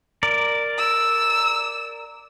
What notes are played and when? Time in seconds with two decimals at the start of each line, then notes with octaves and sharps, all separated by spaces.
0.23 A#4 D5
0.78 E6